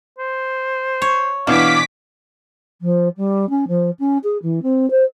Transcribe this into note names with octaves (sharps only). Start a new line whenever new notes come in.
C5
C#5
B2 E3 B3 D4 F5 D6 B6
F3
G3
C#4
F3
C#4
G#4
E3
C4
C5